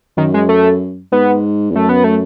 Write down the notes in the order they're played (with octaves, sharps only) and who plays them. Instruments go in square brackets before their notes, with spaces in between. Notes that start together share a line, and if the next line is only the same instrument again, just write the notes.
[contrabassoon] F#2 [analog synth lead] D#3
[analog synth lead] G#3
A3
[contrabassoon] G#2 [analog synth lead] B3
[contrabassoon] E2
[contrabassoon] F#2 [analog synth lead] A3
[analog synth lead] B3
A3